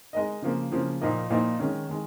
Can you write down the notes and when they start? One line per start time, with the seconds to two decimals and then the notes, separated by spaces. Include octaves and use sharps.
0.13 G#3 D#4 A#4 D#5
0.42 C#3 F3 A#3
0.71 C#3 F3 A#3
1.01 A#2 F3 A#3 D#4
1.30 A#2 F3 A#3 D#4
1.60 D#3 G#3 C#4
1.89 D#3 G#3